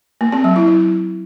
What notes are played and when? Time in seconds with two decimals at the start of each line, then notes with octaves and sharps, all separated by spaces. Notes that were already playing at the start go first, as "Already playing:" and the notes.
0.21 A#3
0.32 C4
0.44 F#3
0.56 E4
0.68 E4